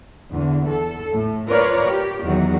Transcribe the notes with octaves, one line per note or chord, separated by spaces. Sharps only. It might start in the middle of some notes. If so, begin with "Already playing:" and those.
E2 D3
A4
A2
F4 A#4 B4 C#5 D5
G4
E2 D#3 F#3 F#4